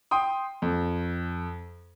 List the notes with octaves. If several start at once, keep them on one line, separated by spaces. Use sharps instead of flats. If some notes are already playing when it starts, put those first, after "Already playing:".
G5 C6 D#6
F2